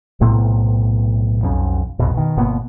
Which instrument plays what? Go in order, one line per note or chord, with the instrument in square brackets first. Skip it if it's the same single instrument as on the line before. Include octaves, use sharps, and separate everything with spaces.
[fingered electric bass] B1 A2 C3 B3
B1 F2 C#4
B1 F2 B2
B2 D#3
G1 B2 A#3 B3